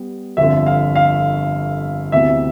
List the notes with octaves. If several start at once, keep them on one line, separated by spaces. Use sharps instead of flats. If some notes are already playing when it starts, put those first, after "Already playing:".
Already playing: G3 B3
G1 F2 D3 E5
F5
F5
D2 C3 E3 B3 E5